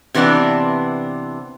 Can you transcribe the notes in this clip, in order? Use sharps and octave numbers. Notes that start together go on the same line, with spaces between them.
C3 E3 B3 C4 D4